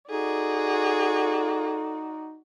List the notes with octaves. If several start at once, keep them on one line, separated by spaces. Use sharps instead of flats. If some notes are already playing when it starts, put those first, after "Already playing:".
D#4 F#4 G#4 A4 D5